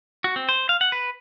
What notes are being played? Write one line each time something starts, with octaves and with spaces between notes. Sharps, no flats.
F#4
C4
C5
F5
F#5
B4